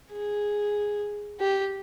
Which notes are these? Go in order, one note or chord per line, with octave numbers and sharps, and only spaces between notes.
G#4
G4